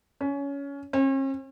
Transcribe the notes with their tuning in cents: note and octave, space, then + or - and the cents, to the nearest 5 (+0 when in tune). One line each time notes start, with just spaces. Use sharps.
C#4 +20
C#4 -45